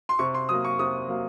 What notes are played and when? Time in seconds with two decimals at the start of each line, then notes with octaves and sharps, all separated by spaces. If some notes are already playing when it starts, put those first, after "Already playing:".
0.09 C6
0.19 C3 C#6
0.34 C6
0.49 F#3 A#3 D#6
0.65 C#6
0.79 C3 D#6
1.08 F#3 A#3